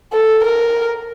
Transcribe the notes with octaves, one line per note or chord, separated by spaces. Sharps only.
A4
A#4